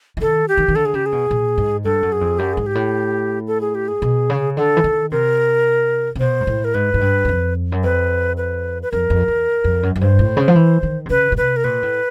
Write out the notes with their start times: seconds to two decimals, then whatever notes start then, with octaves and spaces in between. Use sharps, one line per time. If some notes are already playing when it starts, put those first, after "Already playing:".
0.17 E3
0.21 D#3 A4
0.48 G4
0.57 D#3
0.68 D#3
0.75 D3 A4
0.85 G#4
0.94 C#3 G4
1.06 G#4
1.12 B2
1.31 A#2
1.58 G#2
1.84 G2 A4
2.03 F#2
2.12 G#4
2.21 F2
2.39 F#2 G4
2.53 G#2 G#4
2.66 G4
2.75 A2
3.48 A4
3.61 G#4
3.75 G4
3.88 G#4
4.02 B2
4.30 C#3
4.57 D3 A4
4.77 E3
4.84 D#3
5.11 C3 A#4
6.15 C3
6.19 B2 C5
6.41 G#2
6.47 A2
6.64 A#4
6.74 G#2 B4
6.94 G#2
7.01 G2
7.25 F#2
7.29 F2
7.72 F#2
7.83 F2 B4
8.37 B4
8.83 B4
8.92 F2 A#4
9.10 F2
9.28 E2
9.64 F2
9.83 F#2
9.96 F#2
10.01 G2 C5
10.19 A2
10.37 C#3
10.48 F3
10.55 E3
10.83 D#3
11.06 C3
11.10 C#3 B4
11.32 B2
11.37 C3 B4
11.56 A#4
11.64 A#2 B4
11.83 A2